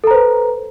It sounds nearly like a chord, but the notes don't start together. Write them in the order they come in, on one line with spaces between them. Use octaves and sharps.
A4 A#5 C5 B4